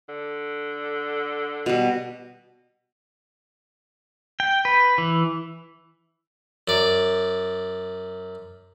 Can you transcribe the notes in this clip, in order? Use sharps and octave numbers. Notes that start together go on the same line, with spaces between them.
D3
B2 G3
G5
B4
E3
F#2 D5